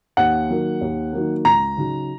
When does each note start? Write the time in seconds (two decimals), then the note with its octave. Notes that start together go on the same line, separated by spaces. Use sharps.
0.17 D#2 F#5
0.49 D#3 F#3 A#3
0.81 D#2
1.13 D#3 F#3 A#3
1.45 C#2 A#5
1.77 C#3 F#3 D#4